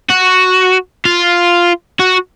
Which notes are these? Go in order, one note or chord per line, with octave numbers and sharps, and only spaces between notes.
F#4
F4
F#4